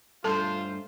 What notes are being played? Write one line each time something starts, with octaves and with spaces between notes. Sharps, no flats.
G2 A3 F4 A4 C5 A5